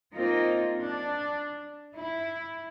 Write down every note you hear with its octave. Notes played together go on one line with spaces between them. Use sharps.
A#3 C4 D#4 F4
D4
E4